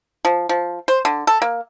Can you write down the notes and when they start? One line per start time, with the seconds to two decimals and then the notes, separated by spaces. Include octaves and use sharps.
0.25 F3
0.49 F3
0.88 C5
1.05 D3
1.27 A4
1.42 A#3